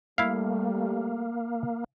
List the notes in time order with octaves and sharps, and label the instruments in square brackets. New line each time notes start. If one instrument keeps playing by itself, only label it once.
[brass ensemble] G3 A3 [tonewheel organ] A#3 [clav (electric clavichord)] E4 F5